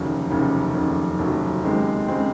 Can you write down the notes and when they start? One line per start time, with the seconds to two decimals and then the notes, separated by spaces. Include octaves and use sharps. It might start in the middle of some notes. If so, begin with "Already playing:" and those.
Already playing: F1 D#2 C#3 F#3
0.30 F1 D#2 C#3 F#3
0.74 F1 D#2 C#3 F#3
1.19 F1 D#2 C#3 F#3
1.64 D#2 C#3 G#3 C4
2.08 C#3 G#3 C4